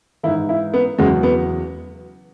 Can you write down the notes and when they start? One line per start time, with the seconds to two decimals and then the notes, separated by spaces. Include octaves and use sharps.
0.23 G#2 E3 E4
0.49 E4
0.74 B3
0.98 E2 C#3 F#3 G#3
1.23 B3